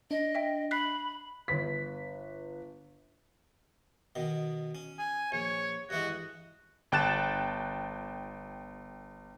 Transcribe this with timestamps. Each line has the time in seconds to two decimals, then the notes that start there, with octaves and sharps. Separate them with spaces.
0.11 D4 D#5
0.35 E5 G5
0.71 B5 F#6 B6 C7
1.48 G1 B4 B6
4.15 B2 D#3
4.75 C#4
4.99 G#5
5.32 A#1 C#5
5.90 G2 E3 G#3 F#4
6.92 G1 G5 A5 F#6 A6 E7